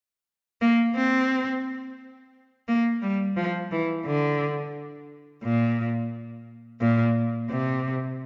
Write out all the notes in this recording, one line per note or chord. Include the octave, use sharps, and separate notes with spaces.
A#3
C4
A#3
G3
F3
E3
D3
A#2
A#2
C3